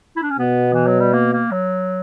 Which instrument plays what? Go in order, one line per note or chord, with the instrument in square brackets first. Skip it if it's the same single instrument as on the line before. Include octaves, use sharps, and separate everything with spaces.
[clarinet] E4
D4
C#4
[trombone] B2 [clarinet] B3
[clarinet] E3
F#3
G3
A#3
A#3
F#3